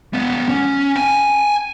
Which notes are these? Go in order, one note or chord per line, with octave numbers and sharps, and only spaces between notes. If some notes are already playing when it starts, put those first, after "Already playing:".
G#3 B3
C#4
G5 G#5